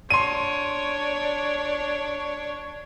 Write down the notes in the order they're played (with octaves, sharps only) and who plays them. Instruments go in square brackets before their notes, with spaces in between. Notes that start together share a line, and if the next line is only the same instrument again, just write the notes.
[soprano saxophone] D4 [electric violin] C#5 [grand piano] C6 D#7